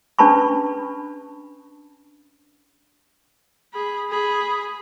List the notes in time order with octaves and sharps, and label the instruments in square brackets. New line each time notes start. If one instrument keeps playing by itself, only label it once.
[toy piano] C#4 D4 B4 A5 B5 C#6
[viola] G#4 B5
G#4 B5